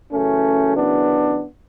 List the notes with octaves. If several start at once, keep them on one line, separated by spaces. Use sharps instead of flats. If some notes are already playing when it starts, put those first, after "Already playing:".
F#2 C#3 E3 A3 C#4
B3 D4